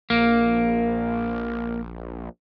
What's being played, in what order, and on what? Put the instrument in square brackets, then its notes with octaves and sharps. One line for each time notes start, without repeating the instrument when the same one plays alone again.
[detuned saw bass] A#1 [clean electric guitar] A#3